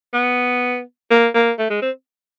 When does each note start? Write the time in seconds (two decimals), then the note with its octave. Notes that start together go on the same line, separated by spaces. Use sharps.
0.14 B3
1.11 A#3
1.35 A#3
1.59 A3
1.70 G#3
1.82 C4